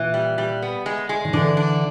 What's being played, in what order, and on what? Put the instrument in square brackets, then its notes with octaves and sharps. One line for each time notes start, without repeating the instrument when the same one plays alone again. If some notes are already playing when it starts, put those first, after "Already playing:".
Already playing: [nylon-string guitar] A#2 [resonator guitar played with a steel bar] E3
[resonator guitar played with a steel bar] G3
G3
B3
G#3
G#3
[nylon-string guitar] D#3
[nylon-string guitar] D3 E3 [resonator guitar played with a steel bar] D4
[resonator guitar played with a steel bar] D4